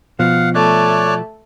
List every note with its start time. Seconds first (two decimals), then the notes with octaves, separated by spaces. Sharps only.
0.19 B2 F3 F5 F#5
0.55 A3 C#5 D5 F#6